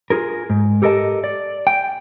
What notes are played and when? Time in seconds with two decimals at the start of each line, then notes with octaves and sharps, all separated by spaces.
0.10 F4 G#4 A#4
0.50 G#2
0.82 G4 A4 A#4 D5 D#5 A5
1.24 D5
1.67 G5